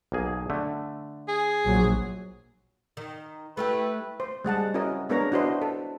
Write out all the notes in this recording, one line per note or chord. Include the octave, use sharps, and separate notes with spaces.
B1 A#3 G#4
D3 A3
G#4
A#1 F#3
D#3
A3 E4 G4 B4
C5
G3 G#3 F#5 A5
C#4 E4 F#4 A#4 D#5
G#3 B3 D4 A#4 C#5 A#5
D4 E4 F#4 B4 C5 D#5
A4